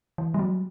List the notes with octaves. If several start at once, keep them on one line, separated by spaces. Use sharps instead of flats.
E3
G3
F#3